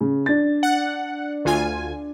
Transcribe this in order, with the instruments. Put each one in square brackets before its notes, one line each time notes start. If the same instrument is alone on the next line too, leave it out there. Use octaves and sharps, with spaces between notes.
[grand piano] C#3
D4 A6
[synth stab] F#5
D2 F4 G#5